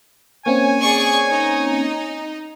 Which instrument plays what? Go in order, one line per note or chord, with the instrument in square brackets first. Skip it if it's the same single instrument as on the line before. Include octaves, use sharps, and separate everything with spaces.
[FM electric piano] A#3 C4 C#4 [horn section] C#5 G#5
[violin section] G#4 D5 C#6
D#4